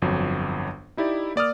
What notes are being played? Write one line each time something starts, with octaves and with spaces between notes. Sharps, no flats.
G1 F2 F#3
D#4 E4 G4 D5
A#3 D5 D#6 F6